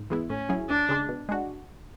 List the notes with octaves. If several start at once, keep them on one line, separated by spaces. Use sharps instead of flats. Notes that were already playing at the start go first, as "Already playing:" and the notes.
Already playing: G#2
E3 G#3 B3 E4
A2 C#4
F#3 C#4 E4 G#4
D2 D4
C#3 G#3
B2
G#3 D4 F#4